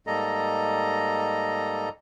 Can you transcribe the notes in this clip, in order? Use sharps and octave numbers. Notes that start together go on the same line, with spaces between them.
G#2 G3 A#3 A4 D#5 A#5